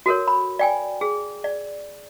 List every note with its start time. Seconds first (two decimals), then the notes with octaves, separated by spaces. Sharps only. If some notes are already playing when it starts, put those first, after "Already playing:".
0.06 F#4 A4 A#4 C#5
0.28 B5
0.59 D5 G5 G#5
1.01 G#4
1.44 D5